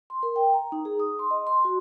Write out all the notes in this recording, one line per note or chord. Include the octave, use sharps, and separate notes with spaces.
C6
A#4
G5
A#5
D#4
G#4
D#6
C6
D#5
C6
F#4